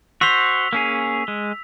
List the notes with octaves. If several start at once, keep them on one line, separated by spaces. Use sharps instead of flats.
F#4 C5 E6 B6 F7
A#3 C#4 G#4
G#3